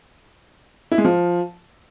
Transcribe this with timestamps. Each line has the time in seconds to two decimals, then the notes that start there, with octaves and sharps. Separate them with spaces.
0.92 E4
0.98 G#3
1.04 F3